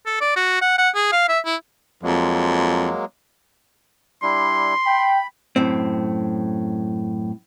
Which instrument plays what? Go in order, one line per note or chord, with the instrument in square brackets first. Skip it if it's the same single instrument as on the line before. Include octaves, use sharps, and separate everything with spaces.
[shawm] A4
D5
F#4
F#5
F#5
G#4
F5
E5
E4
[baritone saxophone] F2 [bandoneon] F#3 G#3 A#3
[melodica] G3 D4 E4 [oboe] C6
[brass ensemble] G5 [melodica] B5
[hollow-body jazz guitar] F#2 A2 C4